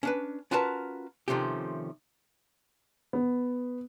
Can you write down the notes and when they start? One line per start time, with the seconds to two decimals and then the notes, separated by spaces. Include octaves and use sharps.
0.03 C#4 D4 B4
0.51 C#4 F4 F#4 A#4 B4 A5
1.28 C3 D#3 F3 A3 C#4 G4
3.13 B3